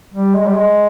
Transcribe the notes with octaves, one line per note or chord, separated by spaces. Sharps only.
G3
G#3
G3
G#3